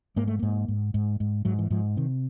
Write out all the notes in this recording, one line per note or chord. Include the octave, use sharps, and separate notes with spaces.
G#2 A#3
A3
G#2 A#3
G#2
G#2
G#2
G#2 F#3
E3
G#2 F3
C3 D#3